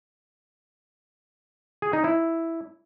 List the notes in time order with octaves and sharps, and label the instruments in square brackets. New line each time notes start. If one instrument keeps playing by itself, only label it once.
[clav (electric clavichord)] G#4
D#4
E4